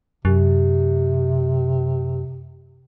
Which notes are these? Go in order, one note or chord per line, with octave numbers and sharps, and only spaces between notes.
F#2 C3